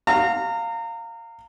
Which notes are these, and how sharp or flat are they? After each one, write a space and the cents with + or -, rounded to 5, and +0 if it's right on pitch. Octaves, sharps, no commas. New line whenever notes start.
F5 +0 A#5 -30